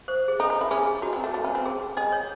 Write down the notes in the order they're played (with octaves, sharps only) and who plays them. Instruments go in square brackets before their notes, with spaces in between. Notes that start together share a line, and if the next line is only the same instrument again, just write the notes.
[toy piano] C5
G#4
[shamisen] D#4 [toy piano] A4
[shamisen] D#4
E4
[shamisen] C#4 [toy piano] G#4
[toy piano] G#4
[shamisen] D#4 [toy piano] F#4
[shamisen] C4
A3
A3
C#4
C4
[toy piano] G#4
[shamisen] G#4 [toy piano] D#5
[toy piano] C#5